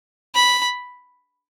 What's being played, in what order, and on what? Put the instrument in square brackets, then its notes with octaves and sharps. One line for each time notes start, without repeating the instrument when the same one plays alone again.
[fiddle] B5